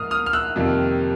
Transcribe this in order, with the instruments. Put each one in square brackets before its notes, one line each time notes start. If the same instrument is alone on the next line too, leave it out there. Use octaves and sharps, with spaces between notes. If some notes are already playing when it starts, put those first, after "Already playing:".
Already playing: [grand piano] G#2 F3 A#3 D#6 F6
D#6 F6
F6
E6 F#6
F2 C3 D#3 G3 A#3